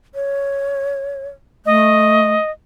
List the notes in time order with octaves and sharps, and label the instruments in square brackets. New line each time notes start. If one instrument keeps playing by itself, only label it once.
[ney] C#5
[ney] A3 [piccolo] D#5